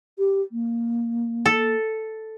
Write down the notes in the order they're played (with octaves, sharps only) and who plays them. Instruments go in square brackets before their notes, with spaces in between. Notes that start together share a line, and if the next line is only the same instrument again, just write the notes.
[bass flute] G4
A#3
[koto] A4